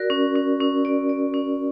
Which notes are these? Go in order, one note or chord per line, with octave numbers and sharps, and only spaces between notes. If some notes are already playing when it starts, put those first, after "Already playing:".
Already playing: F#4 A#4 D5
C#4
C#4
C#4
D5
D5
C#4